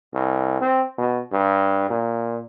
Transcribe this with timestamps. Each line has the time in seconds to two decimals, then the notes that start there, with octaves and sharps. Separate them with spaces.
0.14 C2
0.61 C4
0.98 B2
1.32 G2
1.90 A#2